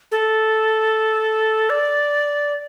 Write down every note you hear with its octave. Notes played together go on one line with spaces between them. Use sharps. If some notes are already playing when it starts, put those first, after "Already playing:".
A4
D5